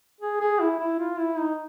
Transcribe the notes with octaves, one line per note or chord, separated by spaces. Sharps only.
G#4
G#4
E4
E4
F4
E4
D#4